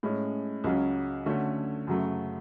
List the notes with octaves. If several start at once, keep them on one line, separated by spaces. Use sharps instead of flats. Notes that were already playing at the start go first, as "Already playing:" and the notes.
A2 G#3 C#4
C#2 C#3 F#3 C#4
D3 A3 C#4 F#4
F#2 C#3 F#3 A3